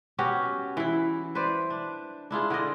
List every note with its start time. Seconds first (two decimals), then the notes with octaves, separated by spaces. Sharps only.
0.18 B3 C#4 F#4 G4
0.77 E3 E4
1.35 B4 C5 D5
1.70 D4
2.31 D4 E4 F4 G#4
2.50 D3 F4 D5 D#5